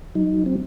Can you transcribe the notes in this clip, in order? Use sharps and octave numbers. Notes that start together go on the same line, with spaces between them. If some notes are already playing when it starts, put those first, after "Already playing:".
F#3 D#4
C4